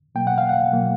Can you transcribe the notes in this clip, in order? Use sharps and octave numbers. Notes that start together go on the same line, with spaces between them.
B2 F#3 A#3 G5
F#5
F5
F#5
B2 F#3 A#3